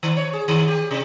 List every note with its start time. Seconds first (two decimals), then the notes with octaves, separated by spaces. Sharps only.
0.03 D#3
0.17 C#5
0.33 G#4
0.48 D#3
0.68 G4
0.91 C3